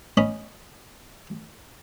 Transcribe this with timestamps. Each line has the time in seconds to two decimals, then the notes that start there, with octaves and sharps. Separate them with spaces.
0.17 C#4 D#5 B5